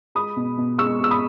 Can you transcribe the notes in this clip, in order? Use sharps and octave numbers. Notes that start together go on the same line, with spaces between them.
G#3 B5 D#6
B2
B2
G#3 C#6 E6
G#3 E6
B5 D#6